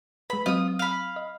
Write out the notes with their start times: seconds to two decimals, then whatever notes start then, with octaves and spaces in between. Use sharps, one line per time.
0.30 G#3 B4 B5
0.46 F#3 C4 F4 D#5 D#6
0.79 F5 B5
1.16 D#5